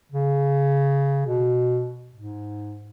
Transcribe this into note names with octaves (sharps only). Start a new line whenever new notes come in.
C#3
B2
G#2